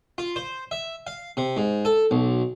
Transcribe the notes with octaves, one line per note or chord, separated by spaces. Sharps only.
F4
C5
E5
F5
C3
G#2
A4
B1